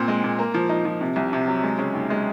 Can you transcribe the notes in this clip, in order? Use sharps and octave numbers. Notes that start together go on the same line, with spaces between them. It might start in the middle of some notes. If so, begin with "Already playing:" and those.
Already playing: A#2 C4
G#3
A#2
A#3
F3
D#4
F3
C3
C2
C3
F#3
G#3
C#3
D#2
G#3